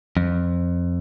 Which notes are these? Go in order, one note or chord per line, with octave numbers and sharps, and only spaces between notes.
F2